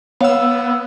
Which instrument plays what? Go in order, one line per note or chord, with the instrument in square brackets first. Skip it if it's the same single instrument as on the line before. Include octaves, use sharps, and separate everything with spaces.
[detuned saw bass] B3 [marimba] C#5 [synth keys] F5 F#5 E6